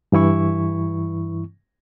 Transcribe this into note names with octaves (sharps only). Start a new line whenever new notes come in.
G2 E3 E4 C#6